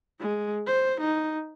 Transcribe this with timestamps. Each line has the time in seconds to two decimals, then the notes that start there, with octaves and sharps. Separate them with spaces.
0.20 G#3
0.67 C5
1.00 D#4